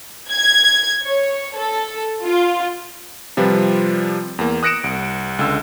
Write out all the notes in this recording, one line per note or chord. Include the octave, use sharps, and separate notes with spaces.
G#6
C#5
A4
F4
C3 F3 G3 F4 B4
E2 A#3
D#6 F#6 A#6 C#7 D7 E7
C2
C#2 D3 E6